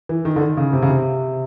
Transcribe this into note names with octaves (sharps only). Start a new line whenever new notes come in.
E3
D#3
D3
D#3
C#3
C3
C#3
C3